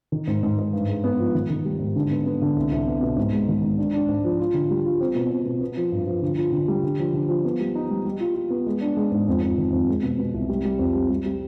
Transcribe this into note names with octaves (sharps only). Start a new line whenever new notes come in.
D#3
G#2
G#2
G#2
G2
G#3
B3
F3
D#3
D#3
G3
G#2
D3
B3
B3
D3
C2
C2
B3
B2
G#2
G#3
D#3
G#2
D4
D4
G#2
F3
F4
D3
G3
F4
C4
B2
C4
B2
B3
F3
G2
F3
D3
F4
D3
G3
D3
F3
D3
F3
B3
G3
D#4
G3
G3
F4
F4
B3
G#3
D4
G#3
G#2
F2
F2
D#3
F2
G#3
B2
B2
C2
G3
G3
F2
G3
G3
G3